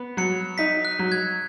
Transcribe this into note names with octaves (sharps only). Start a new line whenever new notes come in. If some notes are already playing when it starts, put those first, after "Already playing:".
Already playing: B3
F#3 C#7
D#4 B6
F#6
F#3
G#6